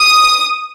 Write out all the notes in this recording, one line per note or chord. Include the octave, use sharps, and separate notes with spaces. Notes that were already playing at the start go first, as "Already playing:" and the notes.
Already playing: D#6